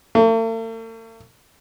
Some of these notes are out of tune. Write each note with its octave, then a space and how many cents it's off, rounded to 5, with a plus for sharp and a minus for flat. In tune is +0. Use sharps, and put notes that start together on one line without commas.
A3 +45